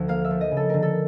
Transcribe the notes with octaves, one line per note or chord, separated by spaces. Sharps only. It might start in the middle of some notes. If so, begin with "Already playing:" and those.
Already playing: D2 F3
A#3 F5
E5
F3
D#5
C#3
A4
D3 A#4
A4